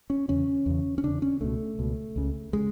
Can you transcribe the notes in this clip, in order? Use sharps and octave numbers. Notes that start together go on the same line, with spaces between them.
C#4
E2 C#3 C#4
E2 C#3
C#4
E2 C#3 D4
C#4
C#2 B2 A3
C#2 B2
C#2 C#3
C#3 G#3